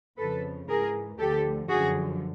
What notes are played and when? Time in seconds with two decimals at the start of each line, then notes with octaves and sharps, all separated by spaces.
0.18 F2 C#3 F3 A4 B4
0.69 G#2 E3 G#4 A#4
1.18 D2 D3 F3 G4 A4
1.69 F#2 D3 F3 F#4 G#4